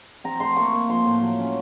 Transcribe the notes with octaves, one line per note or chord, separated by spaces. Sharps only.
C4 A#5
A3 C6
A#3 C#6
A#3
F3 C6
A2
F#3
C#4